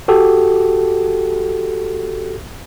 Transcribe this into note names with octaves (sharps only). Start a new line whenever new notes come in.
F#4 G4 A4